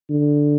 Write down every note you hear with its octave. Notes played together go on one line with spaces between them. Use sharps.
D3